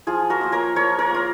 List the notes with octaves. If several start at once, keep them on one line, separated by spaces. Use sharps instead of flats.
F3 F4 G#4
F#4 A#4
A#3 F4
A#4 C#5
F3 A#4 C#5
A#4 C#5
A#3 F4